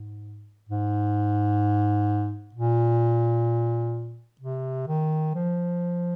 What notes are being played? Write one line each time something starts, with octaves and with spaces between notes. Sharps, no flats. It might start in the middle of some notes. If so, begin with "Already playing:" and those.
Already playing: G#2
G#2
A#2
C3
D#3
F3